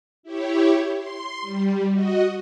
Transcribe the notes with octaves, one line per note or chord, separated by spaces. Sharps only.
E4 G4 C#5
C6
G3
F#4 D#5